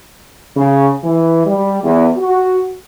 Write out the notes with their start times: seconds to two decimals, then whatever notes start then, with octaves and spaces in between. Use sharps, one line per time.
0.55 C#3
1.04 E3
1.46 G3
1.83 E2
2.17 F#4